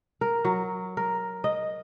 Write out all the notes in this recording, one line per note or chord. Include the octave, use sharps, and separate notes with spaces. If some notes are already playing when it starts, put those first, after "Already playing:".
A#4
F#3
A#4
D#5